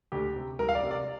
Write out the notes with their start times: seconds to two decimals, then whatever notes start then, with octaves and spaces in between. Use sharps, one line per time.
0.12 D2 G4
0.36 C3
0.59 C2 A#4
0.69 F5
0.75 D5
0.83 C3
0.91 D5